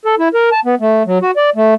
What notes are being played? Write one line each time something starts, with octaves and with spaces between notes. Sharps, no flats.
A4
E4
A#4
A5
B3
A3
F#3
F#4
D5
A3